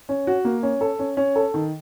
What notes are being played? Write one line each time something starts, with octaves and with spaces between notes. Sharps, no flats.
C#4
F#4
A#3
C#4
A4
C#4
C#4
A4
D#3